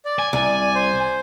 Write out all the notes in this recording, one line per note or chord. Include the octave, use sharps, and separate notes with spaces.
D5
G#5
C2 D5
C5